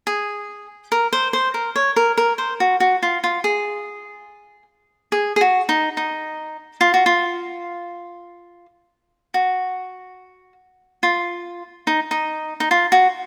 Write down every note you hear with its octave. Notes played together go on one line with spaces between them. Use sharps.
G#4
A#4
C5
C5
A#4
C#5
A#4
A#4
C5
F#4
F#4
F4
F4
G#4
G#4
G#4
F#4
D#4
D#4
F4
F#4
F4
F#4
F4
D#4
D#4
D#4
F4
F#4